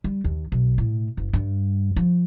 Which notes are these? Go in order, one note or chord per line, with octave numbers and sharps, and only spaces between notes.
G3
D#2
B1
A2
F#1
G2
F3